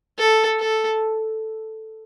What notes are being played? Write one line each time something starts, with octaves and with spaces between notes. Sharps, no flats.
A4
A4